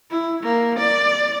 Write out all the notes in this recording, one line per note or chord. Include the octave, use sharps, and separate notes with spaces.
E4
A#3
D5